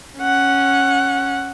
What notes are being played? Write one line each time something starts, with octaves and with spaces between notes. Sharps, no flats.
C#4 F#5